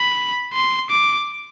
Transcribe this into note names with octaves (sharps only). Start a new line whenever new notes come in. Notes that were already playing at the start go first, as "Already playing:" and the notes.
Already playing: B5
C6
D6